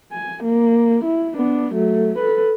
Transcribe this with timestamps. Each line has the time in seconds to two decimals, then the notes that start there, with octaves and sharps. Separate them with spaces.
0.12 G#5
0.44 A#3
1.04 E4
1.36 B3 D4
1.74 F#3 A3
2.18 A4 B4